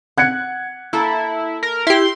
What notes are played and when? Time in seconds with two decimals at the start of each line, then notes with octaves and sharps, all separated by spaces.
0.18 F#5 F#6 G#6 C#7
0.93 A#3 E4 A4
1.63 A#4
1.87 E4 G4 C6